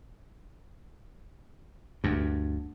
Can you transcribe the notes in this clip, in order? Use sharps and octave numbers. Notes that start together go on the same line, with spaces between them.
D2 G2